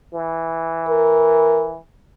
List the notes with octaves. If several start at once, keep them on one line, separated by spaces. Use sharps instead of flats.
E3
A#4